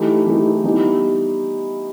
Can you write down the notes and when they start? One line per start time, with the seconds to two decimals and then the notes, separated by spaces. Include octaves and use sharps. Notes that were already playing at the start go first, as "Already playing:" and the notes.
Already playing: E3 A3 D#4 G4
0.26 E3 A3 D#4 G4
0.64 E3 G3 B3 D#4